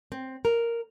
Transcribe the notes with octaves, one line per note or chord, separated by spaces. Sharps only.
C4
A#4